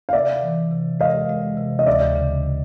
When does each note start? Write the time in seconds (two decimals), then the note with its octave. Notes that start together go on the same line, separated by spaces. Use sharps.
0.09 F5
0.13 C3 D5 E5
0.42 E3
0.71 C3
1.00 G#3 D#5 F5
1.29 G#3
1.57 C3
1.79 D#5
1.86 D2 D5 E5
2.16 C#3